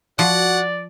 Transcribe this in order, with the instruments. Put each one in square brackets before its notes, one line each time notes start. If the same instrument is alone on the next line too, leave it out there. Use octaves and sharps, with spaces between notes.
[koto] F3 [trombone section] F#4 [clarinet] D5 [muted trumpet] F#5